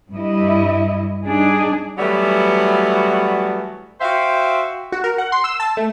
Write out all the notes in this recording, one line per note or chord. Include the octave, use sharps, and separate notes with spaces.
G2 G3 E4 D#5
G3 D4 D#4 G#4
E3 F#3 G3 A3 B3 F#4
F#4 C5 E5 F5 G5
F#4
A#4
F#5
C6
E6
A5
A3